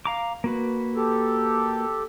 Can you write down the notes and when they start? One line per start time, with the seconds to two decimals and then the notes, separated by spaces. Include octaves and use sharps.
0.05 F5 A#5 D6
0.44 A#3 F#4 B4
0.95 G4 A4